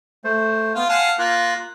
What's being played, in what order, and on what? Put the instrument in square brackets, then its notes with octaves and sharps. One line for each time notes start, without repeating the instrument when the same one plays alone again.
[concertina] A3 C5
[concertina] B3 [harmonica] F4
[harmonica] F5 F#5 [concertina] G#5 A5
[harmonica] A#3 [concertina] F4 F#6